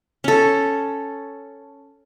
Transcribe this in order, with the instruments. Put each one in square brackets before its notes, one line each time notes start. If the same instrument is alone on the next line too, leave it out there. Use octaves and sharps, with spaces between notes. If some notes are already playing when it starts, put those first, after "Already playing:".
[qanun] C#4 A4